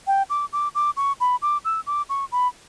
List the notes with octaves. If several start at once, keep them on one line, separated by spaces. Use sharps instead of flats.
G5
D6
D6
D6
C#6
B5
D6
E6
D6
C#6
B5